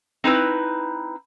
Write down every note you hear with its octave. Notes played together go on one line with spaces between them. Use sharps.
C4 D#4 E4 B4